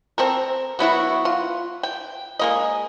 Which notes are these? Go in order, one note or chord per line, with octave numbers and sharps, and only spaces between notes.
C4 A4 A#4
F#3 B3 E4 F#4
F4
G5
G#3 A#3 D#5